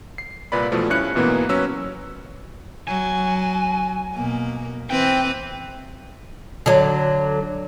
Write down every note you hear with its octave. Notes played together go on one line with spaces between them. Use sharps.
C7
C2 A#2 B4 D5 B5
B2 E3 F3 A3
G2 C#4 E4 F#6 C#7
G#2 B2 E3 A#3 B3
F#3 C#4 B4 E6
F#3 G#5
B2 A#3
E3 C4 B4 G5
D3 F#3